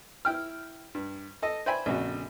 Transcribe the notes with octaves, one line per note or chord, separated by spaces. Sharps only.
E4 G5 F6
G2
A4 D#5
C5 D5 E5 G5 G#5 B5
A#1 F2 C#3 D4 F#4